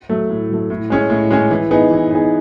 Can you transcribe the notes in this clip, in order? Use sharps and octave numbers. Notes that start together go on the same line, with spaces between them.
F#3 A3
A2
F#3 A3
A2
G#3 C#4 G#4
A2
G#3 C#4 G#4
E3
B3 D#4 G#4
E3
B3 D#4 G#4